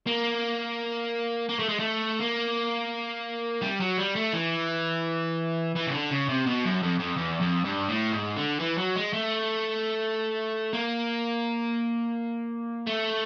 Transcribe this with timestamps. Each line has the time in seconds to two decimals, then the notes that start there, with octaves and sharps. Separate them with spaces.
0.07 A#3
1.49 A#3
1.59 A3
1.69 G#3
1.79 A3
2.20 A#3
3.62 G3
3.80 F#3
3.98 G3
4.16 A3
4.33 E3
5.76 E3
5.87 C#3
5.93 D3
6.11 C#3
6.29 C3
6.46 B2
6.65 F#2
6.83 F2
7.00 F2
7.18 E2
7.41 F2
7.65 G2
7.89 A2
8.12 G#2
8.36 D3
8.60 E3
8.78 F#3
8.96 G#3
9.13 A3
10.73 A#3
12.87 A3